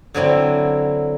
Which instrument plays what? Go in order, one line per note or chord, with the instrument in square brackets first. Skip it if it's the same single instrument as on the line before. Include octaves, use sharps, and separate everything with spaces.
[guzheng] D3 F#3 C4 E4